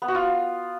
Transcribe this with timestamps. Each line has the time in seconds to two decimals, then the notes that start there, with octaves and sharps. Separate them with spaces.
0.02 B3
0.08 F#4
0.15 F4